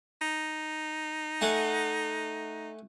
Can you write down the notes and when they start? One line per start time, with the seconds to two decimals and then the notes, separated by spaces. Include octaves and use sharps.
0.22 D#4
1.41 A3 F#5 G#5